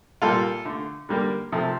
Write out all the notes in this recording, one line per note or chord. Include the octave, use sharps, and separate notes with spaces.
A#2 G3 A#3 F4 A4
D3 A3
D3 G3 A#3
C3 F3 A3